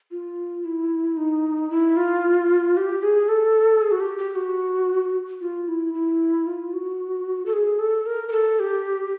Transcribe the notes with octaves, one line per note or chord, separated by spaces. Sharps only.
F4
E4
D#4
E4
F4
G4
G#4
A4
G#4
F#4
G4
G4
F#4
F4
E4
E4
F4
F#4
A4
G#4
A4
A#4
A#4
A4
G4